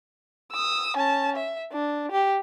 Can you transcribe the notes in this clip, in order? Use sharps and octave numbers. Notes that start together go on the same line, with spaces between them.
D#6 E6
C#4 A5
E5
D4
G4